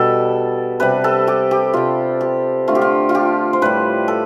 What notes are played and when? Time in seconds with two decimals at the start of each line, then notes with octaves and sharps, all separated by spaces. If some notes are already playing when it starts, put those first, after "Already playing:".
Already playing: B2 G3 A4
0.80 C3 G3 B4
1.04 A4
1.28 G4
1.51 G4
1.74 C3 G3 F4
2.21 G4
2.68 D3 A3 F4
2.75 G4
2.81 F4
3.09 F4
3.15 G4
3.53 C5
3.62 A2 G3 B4
4.08 A4